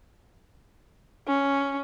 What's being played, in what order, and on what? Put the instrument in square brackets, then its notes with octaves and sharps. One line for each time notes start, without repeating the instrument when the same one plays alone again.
[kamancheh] C#4